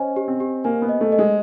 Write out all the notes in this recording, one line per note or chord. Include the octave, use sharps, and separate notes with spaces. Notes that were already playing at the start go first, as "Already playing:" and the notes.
Already playing: C#4 C5 D#5 G#5
G4
C4
G4
A#3 G#5
B3
D#5
A3
D#5
G#3